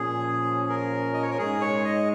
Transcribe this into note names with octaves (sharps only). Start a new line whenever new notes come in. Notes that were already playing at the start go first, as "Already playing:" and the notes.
Already playing: A#2 F3 C#4 G#4
A#4
D#5
C#5
A#4
G#2 G#3 D#4 G#4
C#5
D#5